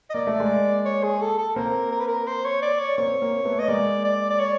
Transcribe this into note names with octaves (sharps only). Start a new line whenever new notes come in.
D#5
A#3 D5
A3
G#3 A#3
C#5
G#4
A4
A4
A#3 C4 A#4
A#4
B4
A#4
C5
C#5
D5
C#5
A#3 C4 C#5
A#3 C4
A3 B3
D#5
G#3 A#3 D5
D5
D5
C#5